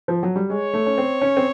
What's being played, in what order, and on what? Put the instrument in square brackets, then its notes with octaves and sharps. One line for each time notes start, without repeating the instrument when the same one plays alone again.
[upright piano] F3
F#3
G3
[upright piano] G#3 [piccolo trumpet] C#5
[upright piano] A3
C#4
C4
C#4
C4